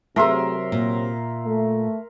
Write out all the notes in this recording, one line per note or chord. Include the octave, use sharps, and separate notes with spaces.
C3 F#3 A3 G#4 A#4 E5 C6
A#2
A3